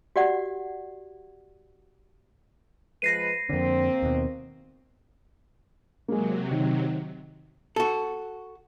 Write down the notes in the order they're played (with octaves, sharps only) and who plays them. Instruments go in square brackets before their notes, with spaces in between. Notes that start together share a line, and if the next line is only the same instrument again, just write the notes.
[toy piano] F#4 G4 D5 F#5
[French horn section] F3 G#3 B4 [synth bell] A#6 C7 D#7
[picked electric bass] F2 D3 [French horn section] A#3 C4
[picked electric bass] D#2 B2
[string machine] C3 F#3 [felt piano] G#3 A#3
[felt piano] D#3
[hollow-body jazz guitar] F#4 A4